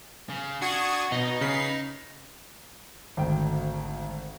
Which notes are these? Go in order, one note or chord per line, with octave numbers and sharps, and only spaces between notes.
C#3
D4 F#4 C#6 D#6 G#6
B2 D#4 D#5
C#3 B4 C7
G#1 D2 G5